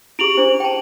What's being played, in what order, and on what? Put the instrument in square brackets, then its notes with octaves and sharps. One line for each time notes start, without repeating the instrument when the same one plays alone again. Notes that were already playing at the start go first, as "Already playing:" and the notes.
[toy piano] E4 G4 G#4 [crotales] D7 F7 F#7
[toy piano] D4 E4 C5
G5 A5